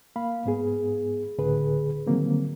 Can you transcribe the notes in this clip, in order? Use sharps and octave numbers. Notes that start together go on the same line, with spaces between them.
A#3 F5 B5
G#2 B3 G#4
C#2 A2 D3 G#4 B4
D3 D#3 F#3 G3 A#3 C4